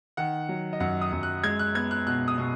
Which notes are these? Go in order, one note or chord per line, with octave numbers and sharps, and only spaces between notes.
D#3 F#5
F#3
D#5
F#2 F#5
D#6
F#2
F#6
G#3 G#6
F#6
B3 G#6
F#6
B2 F#6
D#6
B2